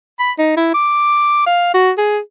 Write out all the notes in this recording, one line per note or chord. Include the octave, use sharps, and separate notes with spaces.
B5
D#4
E4
D6
F5
F#4
G#4